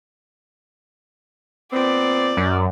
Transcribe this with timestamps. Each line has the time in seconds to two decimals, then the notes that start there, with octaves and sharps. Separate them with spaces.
1.73 A#2 B3 C4 D5
2.37 F#2